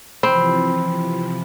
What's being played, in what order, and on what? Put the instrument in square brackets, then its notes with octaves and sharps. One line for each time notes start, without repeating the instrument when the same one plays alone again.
[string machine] C3 E3 F3 [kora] C4 [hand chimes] B5